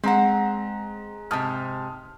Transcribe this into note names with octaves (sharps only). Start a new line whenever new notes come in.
G#3 C4 F#5 A#5
G#2 C3 A5 D#6 F6